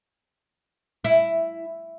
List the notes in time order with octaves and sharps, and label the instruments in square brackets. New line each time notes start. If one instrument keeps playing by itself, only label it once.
[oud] E4